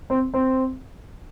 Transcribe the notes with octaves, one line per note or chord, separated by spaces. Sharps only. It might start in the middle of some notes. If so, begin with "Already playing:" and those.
C4
C4